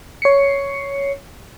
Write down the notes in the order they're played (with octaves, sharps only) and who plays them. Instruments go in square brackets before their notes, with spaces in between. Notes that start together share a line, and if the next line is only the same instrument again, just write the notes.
[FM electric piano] C#5 C7 C#7